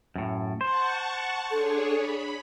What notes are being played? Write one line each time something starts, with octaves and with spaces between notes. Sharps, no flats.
F#2 A2
C5 F#5 A5 C#6
D4 G#4 A4 C#5
B5